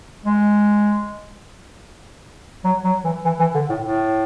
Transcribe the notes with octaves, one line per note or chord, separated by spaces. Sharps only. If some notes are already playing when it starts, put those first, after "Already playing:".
G#3
F#3
F#3
E3
E3
E3
D3
A2
A2